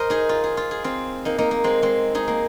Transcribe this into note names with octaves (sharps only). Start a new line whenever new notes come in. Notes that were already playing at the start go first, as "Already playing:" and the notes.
Already playing: A#4 C5 D#5
D#4 G#4
F4
G#4
F4
G#4
C4 F4
A#3 D#4
A#3 D#4
A#3
G#3 C4
G#3 C4
D#4 G#4
A#3